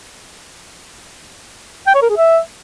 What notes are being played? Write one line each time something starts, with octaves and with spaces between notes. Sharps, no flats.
G5
C#5
A#4
G#4
E5